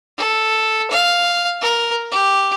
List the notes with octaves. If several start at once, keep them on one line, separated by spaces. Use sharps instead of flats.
A4
F5
A#4
G4